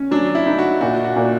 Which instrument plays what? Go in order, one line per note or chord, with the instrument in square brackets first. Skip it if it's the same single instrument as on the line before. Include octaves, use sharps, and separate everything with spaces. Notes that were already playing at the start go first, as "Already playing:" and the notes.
Already playing: [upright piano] C#4
[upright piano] F#3 [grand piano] D4
[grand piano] E4
[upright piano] D#4
[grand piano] F#4
[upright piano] A#2 [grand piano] F#4
[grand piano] F#4
[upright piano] A#2